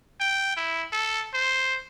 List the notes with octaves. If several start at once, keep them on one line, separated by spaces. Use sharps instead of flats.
G5
E4
A4
C5